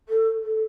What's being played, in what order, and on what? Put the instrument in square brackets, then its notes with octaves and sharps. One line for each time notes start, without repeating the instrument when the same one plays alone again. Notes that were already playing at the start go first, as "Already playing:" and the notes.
[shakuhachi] A4
A4